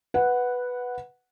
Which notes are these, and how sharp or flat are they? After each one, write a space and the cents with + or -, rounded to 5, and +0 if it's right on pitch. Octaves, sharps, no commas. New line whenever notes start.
B4 +0 F#5 -5